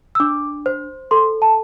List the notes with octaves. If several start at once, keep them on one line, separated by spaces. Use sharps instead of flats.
E6
D4 D6
C5
A4 C6
A5